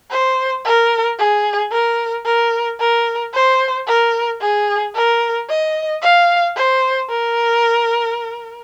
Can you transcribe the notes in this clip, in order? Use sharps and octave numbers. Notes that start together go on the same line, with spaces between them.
C5
A#4
G#4
A#4
A#4
A#4
C5
A#4
G#4
A#4
D#5
F5
C5
A#4